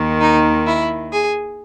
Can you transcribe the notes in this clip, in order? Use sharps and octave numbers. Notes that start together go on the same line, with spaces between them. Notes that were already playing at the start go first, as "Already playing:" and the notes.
Already playing: D#2 D#3
D#4
E4
G#4